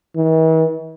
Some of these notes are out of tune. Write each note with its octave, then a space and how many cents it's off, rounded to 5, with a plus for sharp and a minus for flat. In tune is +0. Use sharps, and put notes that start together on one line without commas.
E3 -45